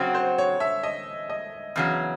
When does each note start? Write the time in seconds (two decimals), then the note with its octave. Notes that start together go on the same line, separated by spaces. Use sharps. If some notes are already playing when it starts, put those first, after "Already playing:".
Already playing: C#3 F#3 C4 F#4
0.14 C5
0.38 C#5
0.60 E5
0.83 D#5
1.30 D#5
1.76 E2 C#3 F#3